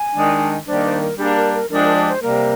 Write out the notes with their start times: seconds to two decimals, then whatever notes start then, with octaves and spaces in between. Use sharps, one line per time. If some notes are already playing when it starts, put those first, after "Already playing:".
Already playing: G#5
0.14 D#3 G#3 D4
0.66 D#3 G3 A#3 D4 C5
0.84 C5
1.01 A#4
1.17 G3 A#3 D4 G#4
1.36 A#4
1.53 A#4
1.70 F3 G#3 D4 G4 A#4
1.83 A#4
1.95 D5
2.08 C5
2.21 C3 G3 A#3 A#4